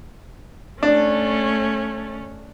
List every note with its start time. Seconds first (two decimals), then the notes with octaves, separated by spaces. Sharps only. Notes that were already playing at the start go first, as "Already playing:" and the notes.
0.83 A3 C#4 D4